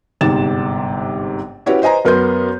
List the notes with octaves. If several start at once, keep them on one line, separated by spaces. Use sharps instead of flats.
G1 G#2 C3 A6 E7
C#4 E4 F#4 G4 B4 C#5
B4 C5 D#5 G#5 A#5
F#2 B3 A#4 B4 C6 G6